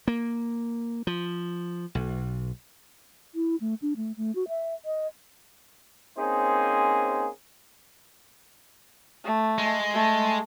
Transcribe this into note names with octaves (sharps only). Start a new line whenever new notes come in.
A#3
F3
B1
E4
A3
D4
A3
A3
F#4
E5
D#5
A#3 C4 C#4 D#4 G#4 C5
A3
G#3
A3